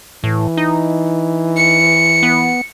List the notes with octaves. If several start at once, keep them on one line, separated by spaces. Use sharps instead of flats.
A2 E3
D#4
C#7
B3